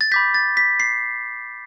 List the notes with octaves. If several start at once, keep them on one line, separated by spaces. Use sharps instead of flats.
A6
B5 D6 G6 B6
A6
B6
C7